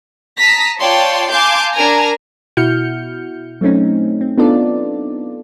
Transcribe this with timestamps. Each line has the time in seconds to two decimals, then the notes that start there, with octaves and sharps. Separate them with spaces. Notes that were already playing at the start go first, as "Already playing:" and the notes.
0.38 A5 A#5 D#6 A#6 B6
0.80 F4 C#5 D5 G5 A5 C6
1.30 F5 G#5 A5 C6 D6 G6
1.73 D4 A#4 G#5 A#5
2.57 B2 E4 F#4 F6 G6 C#7
3.61 F#3 A3 C4 C#4 D#4
4.21 C4
4.38 B3 D4 D#4 F4 A4 D5